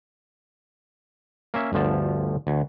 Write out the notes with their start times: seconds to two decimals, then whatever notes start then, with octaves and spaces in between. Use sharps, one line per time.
1.54 A#3 C#4 E5
1.73 G1 D2 F3 A5
2.47 D2